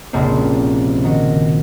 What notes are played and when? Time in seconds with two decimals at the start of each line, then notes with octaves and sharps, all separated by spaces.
0.13 F1 A#1 C#3 A#3 C4
1.04 D#3 F#4 A#6